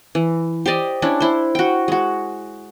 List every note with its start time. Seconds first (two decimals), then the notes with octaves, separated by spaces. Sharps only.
0.15 E3
0.66 G4 C5 D5 D#5
1.02 C#4 D4 E4
1.20 E4 C5
1.55 F#4 G5
1.88 G#3 F#4